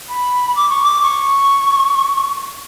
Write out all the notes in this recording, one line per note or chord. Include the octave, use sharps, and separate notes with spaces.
B5
D6
C#6
D6
C#6